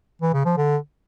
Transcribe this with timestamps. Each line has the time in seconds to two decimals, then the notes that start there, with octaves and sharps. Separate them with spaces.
0.22 E3
0.34 C#3
0.45 F3
0.57 D3